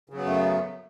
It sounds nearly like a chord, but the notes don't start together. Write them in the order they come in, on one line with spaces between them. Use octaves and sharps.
C#3 F#3 B3 F#2 A3